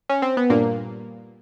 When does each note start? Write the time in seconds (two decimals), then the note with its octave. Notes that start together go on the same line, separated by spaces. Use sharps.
0.10 C#4
0.22 C4
0.37 B3
0.50 G2 A#2 A#3